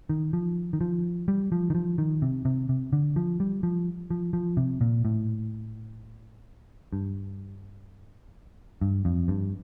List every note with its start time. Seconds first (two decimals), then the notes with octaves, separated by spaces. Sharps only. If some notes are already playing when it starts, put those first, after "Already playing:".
0.09 D#3
0.33 F3
0.73 D#3
0.81 F3
1.28 G3
1.52 F3
1.70 D#3
1.75 F3
1.98 D#3
2.22 C3
2.45 C3
2.69 C3
2.93 D3
3.16 F3
3.40 G3
3.63 F3
4.10 F3
4.33 F3
4.57 C3
4.81 A#2
5.05 A2
6.93 G2
8.81 G2
9.05 F2
9.28 G2